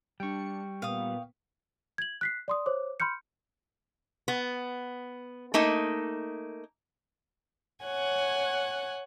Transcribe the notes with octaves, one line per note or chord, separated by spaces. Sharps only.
G3 D4 G5 C#6 C#7
A#2 B3 F5 D#6
G#6 F#7
F#6 B6 C7
D5 C6 D#6
C5 C#5 D6
B5 C6 F6 G6 C#7
B3
A3 A#3 D#4
C#5 F#5 G#5 F#6